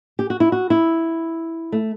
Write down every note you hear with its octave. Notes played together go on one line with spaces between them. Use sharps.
G4
F#4
E4
F#4
E4
A3